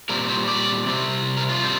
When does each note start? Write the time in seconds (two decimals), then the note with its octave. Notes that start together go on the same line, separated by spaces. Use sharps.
0.09 A#2 G3 C4 A#4
0.29 C5
0.48 D5
0.86 C3 G3 C4
1.37 A#4
1.49 F4
1.64 G3 C4